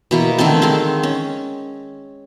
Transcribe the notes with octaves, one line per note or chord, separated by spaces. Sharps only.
B2 E3 A#3
D3 D#3 A3 C4
G#3 C4 F5 C6
C#4